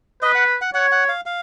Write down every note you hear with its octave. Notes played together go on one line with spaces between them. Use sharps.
B4 D#5
F#5
F#5
C#5 F#5
F#5
F5
F5